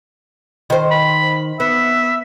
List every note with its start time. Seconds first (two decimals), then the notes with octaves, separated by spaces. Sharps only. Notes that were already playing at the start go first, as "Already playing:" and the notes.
0.70 D#3 C5
0.91 B5
1.60 B3 E5